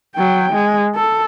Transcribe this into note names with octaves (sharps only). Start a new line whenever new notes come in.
F#3 G5
G#3
A4